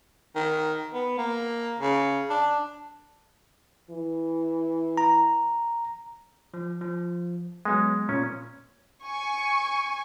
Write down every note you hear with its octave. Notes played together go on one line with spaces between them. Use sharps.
D#3
B3
A#3
C#3
D4
E3
A#5
F3
F3
F#3 G#3 B3 G#5
A#2 C#4
G#5 C#6